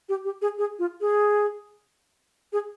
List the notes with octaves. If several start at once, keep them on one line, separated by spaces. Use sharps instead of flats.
G4
G4
G#4
G#4
F4
G#4
G#4